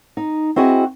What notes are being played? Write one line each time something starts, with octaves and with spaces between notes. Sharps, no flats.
D#4
C4 E4 F#4 G#4 D#5